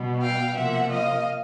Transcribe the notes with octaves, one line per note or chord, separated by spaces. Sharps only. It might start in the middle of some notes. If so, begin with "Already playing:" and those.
Already playing: B2 G3 B3
F5 G5
C3 F3 A#3 E5 F#5
D#5 F5